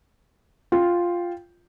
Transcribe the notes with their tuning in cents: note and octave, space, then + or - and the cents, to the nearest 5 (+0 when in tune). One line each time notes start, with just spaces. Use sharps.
F4 +0 G5 +0